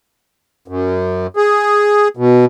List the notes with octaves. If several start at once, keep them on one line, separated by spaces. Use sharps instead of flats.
F#2
G#4
B2